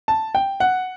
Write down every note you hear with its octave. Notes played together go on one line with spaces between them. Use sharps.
A5
G5
F#5